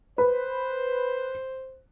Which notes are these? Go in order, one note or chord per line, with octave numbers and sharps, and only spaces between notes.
B4 C5